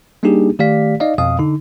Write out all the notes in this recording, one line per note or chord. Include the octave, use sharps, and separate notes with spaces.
G3 A#3 D4 D#4 G4 G#4
D#3 A3 G4 D5 F5 B6
D#4 D5 D#5 F5
F2 B2 F5 D#6
D3 D#4